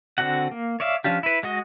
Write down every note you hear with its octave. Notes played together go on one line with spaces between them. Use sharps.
D3 C4 D4 F#4 F#5
A#3
C#5 D5 E5 F5
F3 C#4 D4 F4 G4
E4 B4
G#3 F#4 D#5